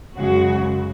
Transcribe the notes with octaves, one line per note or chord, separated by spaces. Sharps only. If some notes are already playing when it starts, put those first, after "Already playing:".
F#2 C#3 G#3 F#4